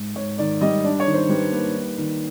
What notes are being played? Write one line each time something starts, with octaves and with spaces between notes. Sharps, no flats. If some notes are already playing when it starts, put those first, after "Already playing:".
Already playing: G#2
G#2 C#5
D#3 D5
G3 D#5
D4 D5
C#5
D#3
C5
G3 B4
A#3 B4
D#4
D#3